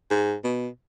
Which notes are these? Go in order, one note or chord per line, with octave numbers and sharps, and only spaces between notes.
G#2
B2